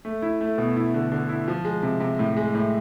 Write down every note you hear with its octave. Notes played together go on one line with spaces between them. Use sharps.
A3
E4
A3
B2
E4
D3
D3
E4
F3
G#3
C3
C3
A2
G#3
A2